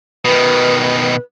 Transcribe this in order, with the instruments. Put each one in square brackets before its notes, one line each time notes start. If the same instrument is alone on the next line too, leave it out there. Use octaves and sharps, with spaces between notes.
[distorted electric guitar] B2 D#3 [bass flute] B4